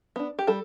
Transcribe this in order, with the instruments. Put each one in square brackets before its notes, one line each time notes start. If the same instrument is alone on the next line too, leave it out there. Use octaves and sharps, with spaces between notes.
[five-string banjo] B3 D4
G4
G3 A4